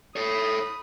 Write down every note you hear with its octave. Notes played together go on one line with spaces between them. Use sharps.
A4 C#5 B5 D#6